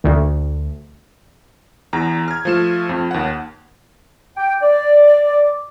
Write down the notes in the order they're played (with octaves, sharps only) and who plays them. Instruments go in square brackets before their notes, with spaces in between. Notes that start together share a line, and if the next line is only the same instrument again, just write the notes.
[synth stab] D2
[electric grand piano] E2 A#5
F6 G#6
F3 A3 E7
F2
D#2 F#5
[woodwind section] G5
D5